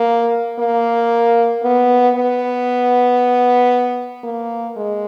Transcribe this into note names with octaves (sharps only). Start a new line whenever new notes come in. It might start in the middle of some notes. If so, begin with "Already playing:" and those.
Already playing: A#3
A#3
B3
B3
A#3
G#3